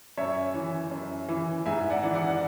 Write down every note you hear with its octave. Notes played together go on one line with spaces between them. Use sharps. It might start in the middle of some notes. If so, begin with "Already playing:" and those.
F#2 C#5 E5
E3
F#2
E3
G#2 E5 G#5
D5 F#5
E3
D5 F#5